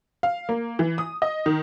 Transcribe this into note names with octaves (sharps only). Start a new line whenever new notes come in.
F5
A#3
E3
D#6
D#5
D#3